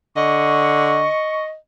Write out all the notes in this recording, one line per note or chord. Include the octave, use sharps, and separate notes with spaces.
D3 D#5 C#6